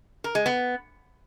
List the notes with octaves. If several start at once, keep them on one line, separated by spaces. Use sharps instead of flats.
A#4
G#3
B3